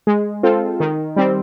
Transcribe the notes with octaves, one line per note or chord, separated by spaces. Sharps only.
G#3
C4 F4 A4
D#3
G3 C4